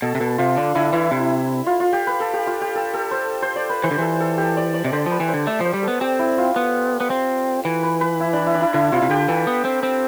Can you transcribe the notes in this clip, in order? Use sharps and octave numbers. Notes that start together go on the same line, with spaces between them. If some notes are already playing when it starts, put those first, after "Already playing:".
B2 A4
C3
B2 A4
C3 F4
D3 D4
D3 E4
E3 E4
C3
F4
F4
G4
B4
A4
G4
F4
G4
A4
A4
C5
C5
D5
B4
E3 C5
D3
E3 A4
A4
G4
D5
D5
C3 D5
D3 C5
F3 B4
E3
C5
D3
A3 D5
F3 C5
G3
B3 A4
C4 G4
E4
F4
B3
B3
C4
E3
B4
B4
E4
D4
E4
D4
E4
D3 E4
C3 F4
C3
D3 G4
E3 A4
B3
C4
C4